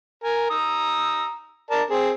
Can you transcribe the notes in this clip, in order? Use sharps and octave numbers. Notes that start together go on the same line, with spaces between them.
A#4 G#5
A#5 D#6 E6
A#4 D5 A5
C4 G#4